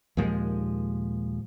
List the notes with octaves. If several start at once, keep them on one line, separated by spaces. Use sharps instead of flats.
D#2 A#2 F3 G#3